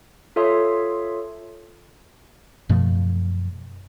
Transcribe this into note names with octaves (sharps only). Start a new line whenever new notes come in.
F4 A4 C#5 E5 C6 D#6
F#2 B2 F3 A3